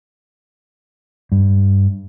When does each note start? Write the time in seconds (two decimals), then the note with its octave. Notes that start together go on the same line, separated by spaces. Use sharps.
1.32 G2